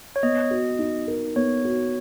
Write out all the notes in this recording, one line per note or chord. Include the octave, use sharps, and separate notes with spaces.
C#5
B3 D#5
F#4
D#4
A#4
B3 C#5
F#4